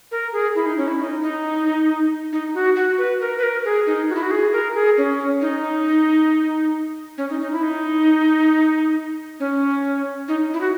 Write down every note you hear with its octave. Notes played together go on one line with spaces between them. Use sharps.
A#4
G#4
E4
D#4
C#4
E4
D#4
D#4
D#4
F#4
F#4
B4
A#4
B4
A#4
G#4
D#4
F#4
E4
F#4
G#4
A#4
G#4
C#4
D#4
C#4
D#4
D#4
E4
D#4
C#4
D#4
E4
F#4